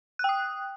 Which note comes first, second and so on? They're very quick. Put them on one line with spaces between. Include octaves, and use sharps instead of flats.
F#6 G5 D#6